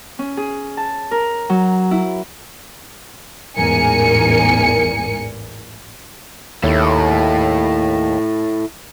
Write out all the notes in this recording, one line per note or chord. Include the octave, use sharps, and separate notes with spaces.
C#4
G#4
A5
A#4
F#3
E4
A1 E2 G#2 A#4 G#5 C#7
D#2 E4 A4 C#5